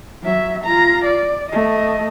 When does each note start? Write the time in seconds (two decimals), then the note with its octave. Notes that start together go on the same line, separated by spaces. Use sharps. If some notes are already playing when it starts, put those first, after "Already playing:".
0.23 F#3 E5
0.65 F4 A#5
1.05 D5
1.50 A3 D#5